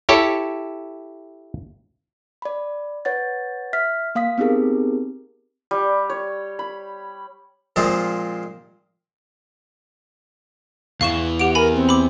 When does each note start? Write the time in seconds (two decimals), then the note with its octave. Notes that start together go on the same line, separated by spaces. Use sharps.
0.09 E4 G4 A4 C#5
2.42 D5 B5
3.05 B4 C#5 F#5 A6
3.73 E5 F6 B6
4.15 A#3 F5 D#6 B6
4.38 B3 C4 D#4 G4 G#4 A#4
5.71 G3
6.10 C#5
6.59 B5
7.76 A#2 F3 G#3 C4
11.01 E2 E3 F5 C#6 E7
11.39 G4 F#5 D7
11.55 A#4 G#5 B5
11.74 C4
11.89 B5 D6